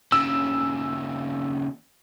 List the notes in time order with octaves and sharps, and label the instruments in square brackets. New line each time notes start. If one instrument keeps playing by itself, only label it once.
[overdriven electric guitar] D#2 C#3 [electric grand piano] E6